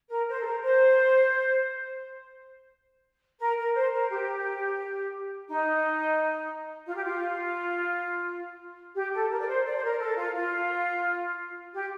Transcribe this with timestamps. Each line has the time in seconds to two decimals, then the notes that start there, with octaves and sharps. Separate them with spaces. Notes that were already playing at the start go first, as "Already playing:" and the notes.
0.09 A#4
0.28 C5
0.40 A4
0.45 A#4
0.61 C5
3.39 A#4
3.57 A#4
3.74 C5
3.92 A#4
4.09 G4
5.48 D#4
6.86 F4
6.94 G4
7.03 F4
8.95 G4
9.12 A4
9.30 A#4
9.39 D5
9.47 C5
9.64 D5
9.75 C5
9.82 A#4
9.99 A4
10.16 F4
10.34 F4
11.73 G4